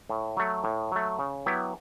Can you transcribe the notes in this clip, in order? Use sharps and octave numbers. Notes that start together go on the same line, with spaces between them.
A2
F#3 A3
A2
F#3 A3
C#3
F#3 B3 E4 G4